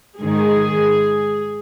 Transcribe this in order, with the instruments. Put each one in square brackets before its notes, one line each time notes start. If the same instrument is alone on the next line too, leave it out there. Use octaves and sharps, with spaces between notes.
[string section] G#2 D#3 G#4